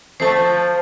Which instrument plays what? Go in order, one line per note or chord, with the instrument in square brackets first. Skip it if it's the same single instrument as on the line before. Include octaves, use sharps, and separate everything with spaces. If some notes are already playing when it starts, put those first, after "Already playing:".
[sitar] F2 A3 [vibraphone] C5 A5
[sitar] F3